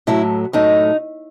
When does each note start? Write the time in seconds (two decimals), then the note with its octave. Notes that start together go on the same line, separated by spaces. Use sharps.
0.07 A2 F#3 A3 E4
0.53 A2 F#3 A3 D#4